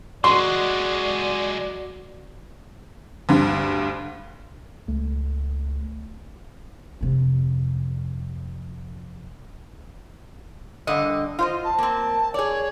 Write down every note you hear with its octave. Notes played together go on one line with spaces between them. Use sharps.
F#3 G#3 F#4 D5 C6
D2 G2
C#2 A3
F2 C3
G2 D3 D#5
F4 C5 D#5
A5
A#3 C4
G#4 C#5 D5